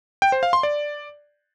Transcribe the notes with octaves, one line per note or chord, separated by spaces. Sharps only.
G5
C5
F5
C6
D5